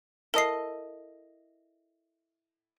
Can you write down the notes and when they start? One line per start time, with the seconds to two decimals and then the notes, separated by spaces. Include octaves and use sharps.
0.34 E4 A4 A#4 D#5 C7